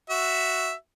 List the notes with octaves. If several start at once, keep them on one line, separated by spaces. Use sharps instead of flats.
F#4 E5